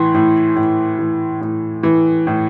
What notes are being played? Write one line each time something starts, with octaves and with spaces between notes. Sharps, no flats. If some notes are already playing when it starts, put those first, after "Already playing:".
Already playing: A2 E3 C6
A2
A2
E3
A2
E3
A2